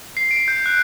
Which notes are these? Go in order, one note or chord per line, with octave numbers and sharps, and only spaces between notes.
C7
D7
G6
F#6